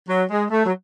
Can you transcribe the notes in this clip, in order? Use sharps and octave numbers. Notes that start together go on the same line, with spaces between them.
F#3
G#3
A3
F#3